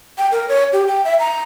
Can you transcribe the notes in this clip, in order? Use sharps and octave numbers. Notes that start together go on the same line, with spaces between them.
G5
A#4
C#5
G4
G5
E5
A#5